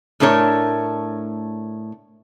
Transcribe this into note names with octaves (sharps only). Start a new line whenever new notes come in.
A2 A3 D4 A#4 C#5